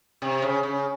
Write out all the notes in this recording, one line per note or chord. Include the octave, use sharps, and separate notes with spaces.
C3
C#3
C#3